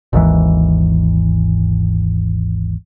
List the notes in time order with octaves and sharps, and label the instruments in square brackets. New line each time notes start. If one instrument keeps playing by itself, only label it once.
[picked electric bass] G#1 D#2 G#2 E3